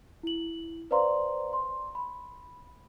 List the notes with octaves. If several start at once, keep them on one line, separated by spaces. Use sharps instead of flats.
E4 F#7
B4 C5 D5 F5 A#5 C6
C6
B5